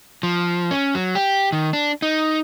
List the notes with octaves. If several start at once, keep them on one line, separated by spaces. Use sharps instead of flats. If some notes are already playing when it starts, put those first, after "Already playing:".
F3
C#4
F#3
G4
D#3
D4
D#4